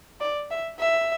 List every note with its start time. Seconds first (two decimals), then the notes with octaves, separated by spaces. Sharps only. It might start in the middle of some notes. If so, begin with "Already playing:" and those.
0.21 D5
0.51 E5
0.80 E5